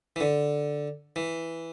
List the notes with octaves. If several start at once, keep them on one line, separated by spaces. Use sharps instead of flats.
E3
D3
E3